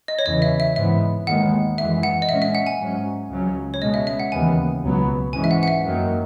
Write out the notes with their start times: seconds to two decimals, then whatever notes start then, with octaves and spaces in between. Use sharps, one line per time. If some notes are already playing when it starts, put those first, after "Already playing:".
0.08 D#5
0.19 C#5
0.26 E2 C#3 E3 D#5
0.42 E5
0.60 E5
0.76 G#2 E3 B3 E5
1.27 D#2 D#3 G#3 B3 F#5
1.78 F#2 E3 G#3 E5
2.03 F#5
2.22 D#5
2.29 A#2 G#3 C#4 E5
2.42 E5
2.55 F#5
2.67 G#5
2.79 G#2 F#3 C#4
3.30 C#2 C#3 F#3 C#4
3.74 C#5
3.81 B2 G#3 C#4 D#5
3.94 E5
4.07 E5
4.20 F#5
4.32 D#2 C#3 E3 B3 G#5
4.82 C#2 B2 F#3 B3
5.33 G#2 E3 G#3 C#4 G#5
5.44 E5
5.51 F#5
5.63 F#5
5.68 E5
5.85 F#2 D#3 F#3 A#3